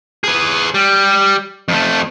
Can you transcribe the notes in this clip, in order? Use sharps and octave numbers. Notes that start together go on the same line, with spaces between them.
G#4 B4
G3
F2 A3